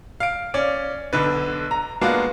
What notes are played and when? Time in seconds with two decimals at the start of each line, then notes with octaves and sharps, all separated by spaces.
0.20 F5 D7
0.54 C#4 D5
1.13 B1 D3 B4
1.71 A#5
2.01 G#3 A#3 B3 D4 F4 F#4